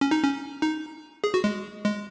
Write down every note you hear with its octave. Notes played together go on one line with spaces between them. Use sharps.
C#4
D#4
C#4
D#4
G#4
F#4
G#3
G#3